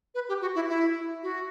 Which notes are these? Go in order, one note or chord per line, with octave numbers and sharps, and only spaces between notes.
B4
G4
F#4
E4
E4
F#4